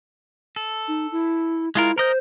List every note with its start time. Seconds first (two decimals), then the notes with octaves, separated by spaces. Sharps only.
0.56 A4
0.88 D#4
1.12 E4
1.75 G#3 E4 F4 A#4
1.98 A#4 C5 D#5 G6